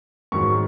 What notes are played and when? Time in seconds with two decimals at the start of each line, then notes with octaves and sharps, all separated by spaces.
0.32 G#2 D#3 F#3 C#6